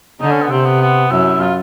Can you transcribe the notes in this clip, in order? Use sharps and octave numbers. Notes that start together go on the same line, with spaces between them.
D3 D#4
C#4
B3
C3 C4
B3
B3
F#2 E4
F4